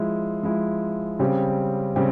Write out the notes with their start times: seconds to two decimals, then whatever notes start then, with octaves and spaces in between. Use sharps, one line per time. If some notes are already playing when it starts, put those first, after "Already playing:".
Already playing: F3 G#3 E4
0.43 F3 G#3 E4
1.19 C#3 G3 C4 G4
1.96 C#3 G3 C4 G4